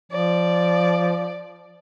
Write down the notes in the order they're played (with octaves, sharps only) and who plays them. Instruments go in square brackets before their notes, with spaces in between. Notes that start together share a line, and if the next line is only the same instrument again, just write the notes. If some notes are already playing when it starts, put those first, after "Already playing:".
[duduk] F3 [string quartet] D5